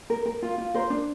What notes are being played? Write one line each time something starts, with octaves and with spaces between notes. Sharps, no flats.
A#4
A#4
F4
F4
A#4 C5
D4